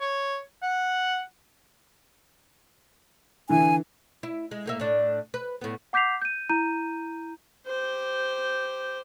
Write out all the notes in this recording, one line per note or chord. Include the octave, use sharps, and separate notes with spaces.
C#5
F#5
D3 E3 G#5
E4
G#3
A2 A#3 E5
A2 D4
B4
A2 B3
F#5 D6 G6 B6 C7 F7
G6 D#7
E4 A#5 G6 D#7
G4 C5